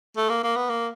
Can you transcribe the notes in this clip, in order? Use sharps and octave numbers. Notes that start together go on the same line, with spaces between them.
A3
A#3
A#3
B3
A#3